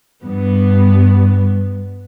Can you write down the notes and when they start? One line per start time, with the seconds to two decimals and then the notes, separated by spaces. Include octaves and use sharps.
0.23 G2 B3